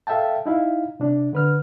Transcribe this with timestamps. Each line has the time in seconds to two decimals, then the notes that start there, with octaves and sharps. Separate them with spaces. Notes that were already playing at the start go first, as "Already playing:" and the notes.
0.07 A4 E5 F5 G5 A5
0.46 D#4 E4 F5
1.00 C3 D4
1.33 D3 B4 F6